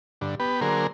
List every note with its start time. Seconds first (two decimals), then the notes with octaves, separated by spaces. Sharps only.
0.21 G2 D3
0.40 B3 G4 B4
0.61 D3 F#3 A#3 G#4 A#4 C5